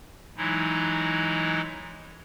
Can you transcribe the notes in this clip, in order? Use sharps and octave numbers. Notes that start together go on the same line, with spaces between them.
E3 F#3 G#3 D#4 E4